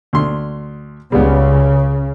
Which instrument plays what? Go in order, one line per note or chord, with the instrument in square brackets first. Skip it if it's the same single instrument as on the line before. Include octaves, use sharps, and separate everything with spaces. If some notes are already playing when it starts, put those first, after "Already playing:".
[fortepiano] D2 C6
[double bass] C#2 [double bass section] C#3 [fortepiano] G3 G#3 B3